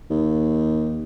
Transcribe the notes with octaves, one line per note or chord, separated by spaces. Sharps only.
D#2